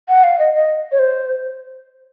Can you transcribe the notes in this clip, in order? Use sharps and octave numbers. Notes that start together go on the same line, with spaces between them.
F#5
F5
D#5
D#5
C#5
C5